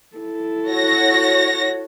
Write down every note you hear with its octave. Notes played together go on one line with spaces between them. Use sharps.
E4 A4
F#4 C#5 A#6